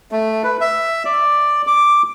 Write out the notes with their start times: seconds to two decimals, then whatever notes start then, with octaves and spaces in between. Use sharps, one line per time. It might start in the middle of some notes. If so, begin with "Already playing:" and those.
0.12 A3
0.44 B4
0.61 E5
1.05 D5
1.67 D6